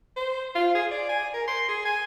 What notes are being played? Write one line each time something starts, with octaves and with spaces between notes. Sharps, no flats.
C5
F4
G#4
D5
G#5
A#4
C6
G#4
G#5